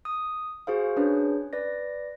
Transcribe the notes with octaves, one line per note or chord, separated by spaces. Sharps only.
D#6
F#4 G#4 C5 F5
C#4 D4 G#4 B4 C#5
B4 D5 A#6